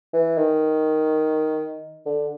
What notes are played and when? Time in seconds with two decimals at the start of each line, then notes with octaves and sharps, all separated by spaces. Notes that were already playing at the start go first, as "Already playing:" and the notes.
0.13 E3
0.37 D#3
2.06 D3